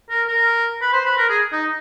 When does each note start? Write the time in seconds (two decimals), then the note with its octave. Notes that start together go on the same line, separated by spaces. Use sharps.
0.10 A#4
0.27 A#4
0.81 B4
0.93 C5
1.05 B4
1.17 A#4
1.29 G#4
1.52 D#4